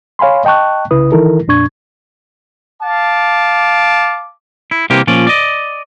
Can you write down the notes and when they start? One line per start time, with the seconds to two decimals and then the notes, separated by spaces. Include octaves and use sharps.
0.19 C#5 F5 G#5 B5 C6
0.45 D#5 G5 A5 C#6 F#6
0.91 C2 C#3 E4 B4 D#6
1.12 D#3 E3 D#4 E4 A4 A#4
1.48 F2 A#2 D4 C#6 G#6
2.82 F5 A5 D6
4.71 E4
4.90 C2 C3 E3 A#3 G4
5.07 A#2 F3 C#4 D5
5.27 D5 D#5